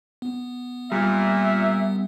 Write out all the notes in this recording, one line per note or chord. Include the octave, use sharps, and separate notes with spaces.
B3
A#2 G3 E5